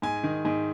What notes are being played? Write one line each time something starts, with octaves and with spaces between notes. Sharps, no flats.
G#2 G#5
D#3
G#2